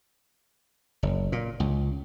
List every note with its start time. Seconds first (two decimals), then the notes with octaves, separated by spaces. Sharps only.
1.03 F#1
1.32 A#2
1.60 C#2